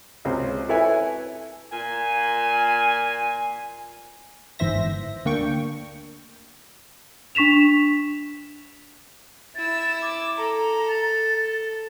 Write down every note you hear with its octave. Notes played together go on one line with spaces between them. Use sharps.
C#2 C3 C5
E4 A4 B4 C#5 E5 G#5
A#2 G#5
G1 G#2 E3 C5 E5 A#6
D2 A#3 D4 G5 C#6
D4 C#6 B6 E7 F7
E4 E6 A6
D6
A4 A#5
A6